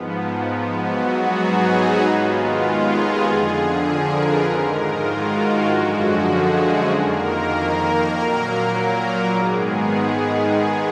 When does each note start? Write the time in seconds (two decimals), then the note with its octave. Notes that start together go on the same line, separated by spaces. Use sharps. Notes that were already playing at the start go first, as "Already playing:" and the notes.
Already playing: G#2 F3 B3
0.81 G#2 F#3 B3 F#4
1.11 G#4
1.41 D#4
2.02 D#2 D#3 G#3 B3 F4
2.32 F4
2.63 G#4
3.23 F2 D3 F3
3.84 A#4
4.15 B4
4.45 G#2 D#3 G#3 A#4
4.75 F4
5.06 F#4
5.66 F#2 D3 F3 G#3
6.26 G#4
6.88 F2 D#3 A#3 A#4
8.09 A#2 F#3 A#3
8.70 A#4
9.30 G#2 D#3 G#3 B3 G#4
10.52 D#2 D#3 G#3 B3